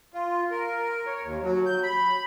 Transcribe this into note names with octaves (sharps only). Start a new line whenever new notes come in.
F4
A#4
C#5
D#2
F#3
G6
B5